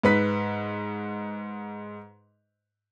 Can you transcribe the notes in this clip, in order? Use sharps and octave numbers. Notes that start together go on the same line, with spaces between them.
G#2 B4 B6